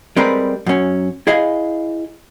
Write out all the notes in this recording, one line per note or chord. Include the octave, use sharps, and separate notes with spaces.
G3 G#3 C4 A#4 B4
F#2 C#4
E4 G#4 D#5 F5 G#5